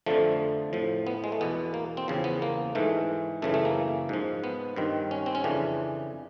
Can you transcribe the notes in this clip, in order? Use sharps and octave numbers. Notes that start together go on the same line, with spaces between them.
F2 D3 F3 A3
A2 F3
B3
G#3
A3
E2 B2 B3
A#3
C4
E2 C#3 F3
B3
A#3
G#2 E3 A3
F#2 C#3 E3 A3
A3
A#3
G#2 F3
B3
G2 D#3 C4
C#4
C4
C#4
F2 C#3 E3 D4